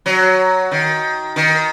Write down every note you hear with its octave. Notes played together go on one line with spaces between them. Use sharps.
F#3
D#3
D#3